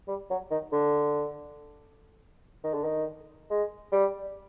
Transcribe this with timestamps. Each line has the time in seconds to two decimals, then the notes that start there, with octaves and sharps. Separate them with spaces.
0.08 G3
0.30 F#3
0.50 D#3
0.72 D3
2.64 D#3
2.74 D3
2.84 D#3
3.50 G#3
3.92 G3